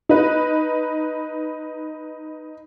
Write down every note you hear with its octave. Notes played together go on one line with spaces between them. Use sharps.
D#4 B4